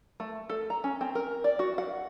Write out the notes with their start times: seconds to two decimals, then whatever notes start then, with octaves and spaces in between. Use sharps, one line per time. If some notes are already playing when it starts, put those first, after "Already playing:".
0.20 A3
0.50 A4
0.70 A#5
0.84 C#4
1.01 C4
1.15 A#4
1.44 D5
1.59 F#4
1.78 F#5